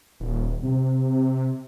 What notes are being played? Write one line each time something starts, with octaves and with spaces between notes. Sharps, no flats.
D#1
C3